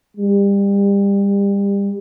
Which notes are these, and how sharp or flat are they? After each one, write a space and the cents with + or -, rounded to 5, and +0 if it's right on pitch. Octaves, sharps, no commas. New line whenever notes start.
G3 +30